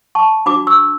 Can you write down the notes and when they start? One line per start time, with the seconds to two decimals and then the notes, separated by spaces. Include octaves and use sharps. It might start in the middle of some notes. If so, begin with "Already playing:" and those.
0.15 A5 C#6
0.46 D4 F#4 B4 B5 D6
0.67 C#6 E6